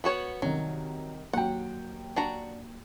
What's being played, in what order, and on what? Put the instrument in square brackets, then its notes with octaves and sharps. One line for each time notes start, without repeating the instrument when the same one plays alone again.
[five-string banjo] B3 F#4 C#5
[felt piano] C2 D#3 [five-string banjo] F#3
[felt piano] D#2 F#3 G5 [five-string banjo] F#5
[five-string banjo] D4 F#4 A#5